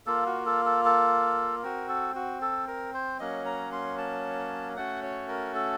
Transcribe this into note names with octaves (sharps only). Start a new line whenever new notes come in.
A#3 F4 A4
F#4
A4
A4
A4
C4 F#4 A#4
A4
F#4
A4
A#4
C5
F#3 A#3 C#4 D#5
A#5
C6
A5
A3 C#4 F#4 F#5
C#5
A#4
A4